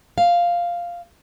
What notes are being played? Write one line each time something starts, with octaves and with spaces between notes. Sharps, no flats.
F5